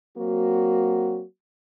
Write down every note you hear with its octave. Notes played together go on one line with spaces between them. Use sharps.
F#3 A#3 C4 F#4